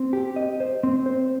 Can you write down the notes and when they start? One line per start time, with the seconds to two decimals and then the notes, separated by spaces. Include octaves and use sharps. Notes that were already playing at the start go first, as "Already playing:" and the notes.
Already playing: C4
0.13 G4
0.36 D#5
0.60 C5
0.83 C4
1.06 C5